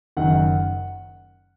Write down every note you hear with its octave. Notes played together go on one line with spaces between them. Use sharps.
F#1 F#2 D#3 F#5